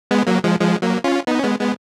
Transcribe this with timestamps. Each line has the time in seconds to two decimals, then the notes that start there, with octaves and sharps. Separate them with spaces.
0.11 G#3 B3
0.27 F#3 A#3
0.44 F3 G#3
0.60 F3 G#3
0.82 F#3 A#3
1.04 C#4 F4
1.27 B3 D#4
1.39 C#4
1.44 G#3 B3
1.61 G#3 B3